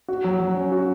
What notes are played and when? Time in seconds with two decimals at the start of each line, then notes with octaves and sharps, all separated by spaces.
0.08 F#4
0.24 F#3
0.40 F#3
0.56 C#4
0.72 F#4